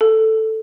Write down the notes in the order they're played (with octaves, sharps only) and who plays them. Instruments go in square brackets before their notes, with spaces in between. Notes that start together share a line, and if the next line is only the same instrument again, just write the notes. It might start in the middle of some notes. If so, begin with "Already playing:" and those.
[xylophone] A4